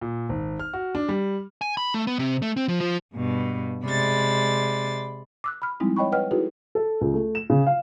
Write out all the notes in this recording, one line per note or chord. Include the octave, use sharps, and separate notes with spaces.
A#2
G#1
F6
F#4
D4
G3
G#5
B5
A3
B3
C3
A3
C4
F3
F3
G2 B2
C3 G#3 D5 B5 C6 A6
D6 E6 F#6
B5 F6
F3 G3 G#3 C4 D#4 E4
C#5 D#5 G5 B5 C#6
B4 C#5 D#5 F#5 G5 F6
D#4 E4 F#4 G#4 A4 B4
A4
C#2
A3
E7
C#3
F5